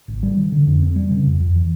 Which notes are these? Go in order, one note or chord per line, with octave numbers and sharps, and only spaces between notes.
G#1
G3
D#3
D3
F2
C4
G3
C#3
F2
F2
E3